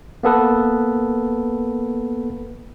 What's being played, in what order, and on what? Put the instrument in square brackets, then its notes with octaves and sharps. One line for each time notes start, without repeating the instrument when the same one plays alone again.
[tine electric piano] A#3 B3 A4 B4